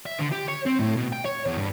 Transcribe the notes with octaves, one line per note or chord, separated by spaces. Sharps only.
E5
D3
G4
C#5
C4
A2
B2
G5
C#5
E2
G2